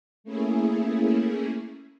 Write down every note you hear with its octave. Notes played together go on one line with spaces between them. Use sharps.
A3 A#3 C#4 E4 G#4